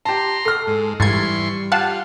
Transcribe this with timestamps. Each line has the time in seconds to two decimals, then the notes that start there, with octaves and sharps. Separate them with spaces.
0.05 G4 A5 A#5 C6
0.45 A4 F6 C7
0.67 G#2
1.00 G#2 E3 G3 C6 C#6 G#6 A6
1.72 F4 G4 F5 F#5 A5